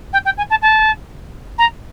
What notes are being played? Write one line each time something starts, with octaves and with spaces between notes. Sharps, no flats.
G5
G5
G#5
A5
A5
A#5